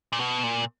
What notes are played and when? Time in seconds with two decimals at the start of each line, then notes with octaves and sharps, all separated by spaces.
0.12 A#2
0.19 B2
0.43 A#2